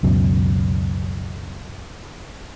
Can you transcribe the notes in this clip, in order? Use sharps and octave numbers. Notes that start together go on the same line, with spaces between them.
C#2 F#2 B2